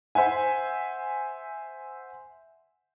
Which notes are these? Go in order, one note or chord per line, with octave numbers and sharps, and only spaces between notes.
C5 E5 F#5 G#5